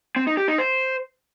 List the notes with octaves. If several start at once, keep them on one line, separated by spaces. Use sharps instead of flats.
C4
D#4
G4
D#4
C5